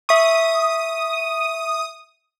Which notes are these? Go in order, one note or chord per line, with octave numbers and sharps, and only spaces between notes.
E5 C#6 D#6